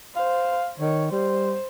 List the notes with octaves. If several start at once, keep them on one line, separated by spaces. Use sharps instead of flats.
C5 F5
D#3 C#5
G3 C5